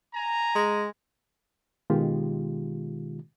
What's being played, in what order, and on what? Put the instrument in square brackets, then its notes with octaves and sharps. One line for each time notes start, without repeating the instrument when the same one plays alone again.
[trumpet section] G#5 A#5
[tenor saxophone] G#3
[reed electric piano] B2 D#3 G#3 F4 G4